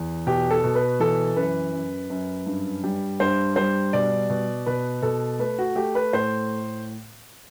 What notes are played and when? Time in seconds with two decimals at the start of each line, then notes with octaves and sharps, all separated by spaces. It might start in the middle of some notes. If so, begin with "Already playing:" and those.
Already playing: E2
0.27 B2 G4
0.51 A4
0.64 B2
0.75 B4
1.00 E3 A4
1.36 F#2 B4
1.73 F#2
2.10 F#2
2.46 G2
2.83 G3
3.20 G2 C5
3.56 G3 C5
3.93 B2 D5
4.30 B2
4.66 B2 B4
5.02 B2 A4
5.39 A3 B4
5.59 F#4
5.76 A3 G4
5.95 B4
6.13 A2 C5